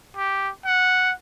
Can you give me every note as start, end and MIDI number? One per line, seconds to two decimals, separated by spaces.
0.17 0.50 67
0.65 1.12 78